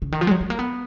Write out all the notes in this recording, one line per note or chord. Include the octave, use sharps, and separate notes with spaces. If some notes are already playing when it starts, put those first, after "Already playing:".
C#3
D#3
F3
G#3
F#3
G#3
A#3
B3